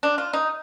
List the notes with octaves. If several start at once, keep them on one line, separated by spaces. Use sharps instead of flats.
D4
F4
D#4